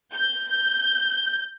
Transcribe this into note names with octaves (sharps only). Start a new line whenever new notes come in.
G6